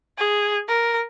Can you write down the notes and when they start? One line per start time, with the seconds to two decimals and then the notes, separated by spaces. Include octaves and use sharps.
0.18 G#4
0.68 A#4